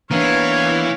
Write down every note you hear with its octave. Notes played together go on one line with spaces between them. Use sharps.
E3 A#3 B3 D4 C#5 F5